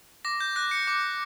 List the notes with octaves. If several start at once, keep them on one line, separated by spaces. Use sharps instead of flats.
D6 A#6
G6
F#6 A#6
C#7
D6